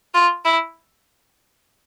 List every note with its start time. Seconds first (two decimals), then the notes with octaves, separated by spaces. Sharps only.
0.14 F4
0.45 E4